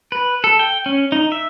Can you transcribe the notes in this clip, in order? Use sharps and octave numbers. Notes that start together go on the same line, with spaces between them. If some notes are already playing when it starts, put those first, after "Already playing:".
B4
A4
G5
C#4
D#4
E5